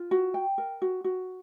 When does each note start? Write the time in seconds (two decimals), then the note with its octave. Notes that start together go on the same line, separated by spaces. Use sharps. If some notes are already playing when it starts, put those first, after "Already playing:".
Already playing: F4
0.11 F#4
0.34 G5
0.58 A#4
0.82 F#4
1.04 F#4